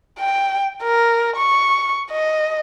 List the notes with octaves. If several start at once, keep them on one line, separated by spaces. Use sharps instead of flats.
G5
A#4
C#6
D#5